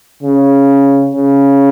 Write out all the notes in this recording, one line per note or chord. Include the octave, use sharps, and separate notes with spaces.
C#3
C#3